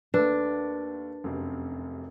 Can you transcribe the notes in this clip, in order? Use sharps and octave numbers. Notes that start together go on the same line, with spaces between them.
D#2 A3 D4 B4
F1 F#2 C3